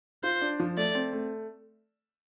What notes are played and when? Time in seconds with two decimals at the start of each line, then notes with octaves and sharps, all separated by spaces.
0.24 F4 C5
0.41 D4
0.60 F3
0.77 A3 D5
0.95 C4
1.13 A3